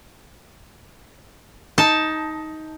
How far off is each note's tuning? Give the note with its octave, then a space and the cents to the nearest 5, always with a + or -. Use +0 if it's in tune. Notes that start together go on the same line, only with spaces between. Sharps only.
D#4 +15 A5 +0